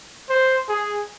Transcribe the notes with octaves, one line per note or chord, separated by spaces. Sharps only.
C5
G#4